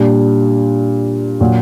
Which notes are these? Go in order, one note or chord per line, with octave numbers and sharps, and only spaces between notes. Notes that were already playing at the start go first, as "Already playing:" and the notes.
Already playing: A#2 G3 D4
A#2 F#3